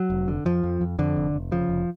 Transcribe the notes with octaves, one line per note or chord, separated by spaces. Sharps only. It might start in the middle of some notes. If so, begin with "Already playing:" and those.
Already playing: F#3
F1
D3
F2 F3
F2
F2
F2 D3
F1
F1
C#3 F3
F1